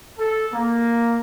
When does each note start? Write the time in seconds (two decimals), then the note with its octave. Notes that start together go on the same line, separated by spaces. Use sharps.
0.18 A4
0.52 A#3